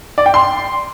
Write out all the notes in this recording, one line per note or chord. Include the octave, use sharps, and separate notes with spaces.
D5
G5
C6